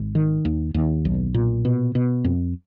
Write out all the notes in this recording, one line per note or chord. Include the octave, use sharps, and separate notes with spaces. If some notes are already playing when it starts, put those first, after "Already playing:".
Already playing: G#1
D#3
D#2
D#2
B1
A#2
B2
B2
F2